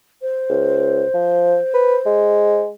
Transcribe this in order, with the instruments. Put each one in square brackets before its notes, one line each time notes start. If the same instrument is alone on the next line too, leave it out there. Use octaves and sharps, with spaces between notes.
[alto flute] C5
[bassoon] C#2
F3
B4
G#3